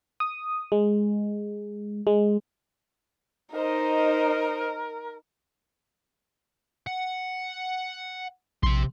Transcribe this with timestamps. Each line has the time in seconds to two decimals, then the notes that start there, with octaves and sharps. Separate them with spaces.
0.20 D#6
0.72 G#3
2.07 G#3
3.55 D#4 A#4 C5 D#5
6.87 F#5
8.63 A#1 C3 C6